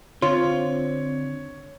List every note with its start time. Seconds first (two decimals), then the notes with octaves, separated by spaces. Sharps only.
0.22 D3 C4 F4 C#5